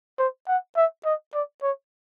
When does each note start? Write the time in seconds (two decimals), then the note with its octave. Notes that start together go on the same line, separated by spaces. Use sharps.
0.19 C5
0.48 F#5
0.77 E5
1.05 D#5
1.34 D5
1.63 C#5